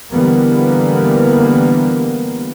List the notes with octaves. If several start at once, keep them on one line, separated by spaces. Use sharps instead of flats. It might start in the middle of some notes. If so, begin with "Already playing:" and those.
D3 E3 G3 A#3 B3